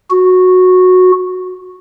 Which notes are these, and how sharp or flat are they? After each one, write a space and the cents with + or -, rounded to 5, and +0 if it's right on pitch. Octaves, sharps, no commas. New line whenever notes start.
F#4 -10